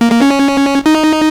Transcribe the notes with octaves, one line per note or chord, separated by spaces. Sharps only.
A#3
A#3
C#4
D#4